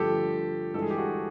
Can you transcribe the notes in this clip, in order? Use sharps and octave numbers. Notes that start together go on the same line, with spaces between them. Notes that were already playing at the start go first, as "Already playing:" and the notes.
Already playing: G2 D3 F3 A3 G4 A4
G2 E3 G#3 A4
G#4
G4
F#4 G#4